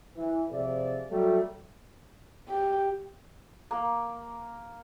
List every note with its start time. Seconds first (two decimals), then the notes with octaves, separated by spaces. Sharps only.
0.16 E3
0.51 C3 F3 G#4 D5 E5
1.10 F#3 G3 A3
2.49 G4
3.71 A#3